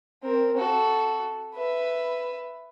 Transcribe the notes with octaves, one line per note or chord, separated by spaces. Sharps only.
C4 A#4
F#4 A4
B4 E5